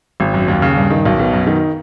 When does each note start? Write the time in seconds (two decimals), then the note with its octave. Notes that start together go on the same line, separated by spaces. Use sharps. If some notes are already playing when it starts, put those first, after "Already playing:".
0.20 G#1
0.34 F#2
0.48 D#2
0.62 C#3
0.76 G2
0.90 D#3
1.05 B1
1.19 B2
1.33 F#2
1.47 D#3